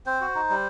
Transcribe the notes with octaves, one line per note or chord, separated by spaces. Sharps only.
C4 C5
F#4
D#4
G3